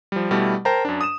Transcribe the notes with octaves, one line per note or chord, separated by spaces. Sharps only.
F3 G3
B2 G3 A3 E4
A#4 C5 G5 A5 A#5
F#2 D4
D#6 E7